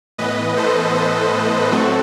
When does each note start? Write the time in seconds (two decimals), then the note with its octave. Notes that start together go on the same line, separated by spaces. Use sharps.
0.18 A2 E3 B3 B4 D#5
0.57 A4 C5
0.95 A4 C5
1.71 A2 F#3 A3 C4 F#4 A4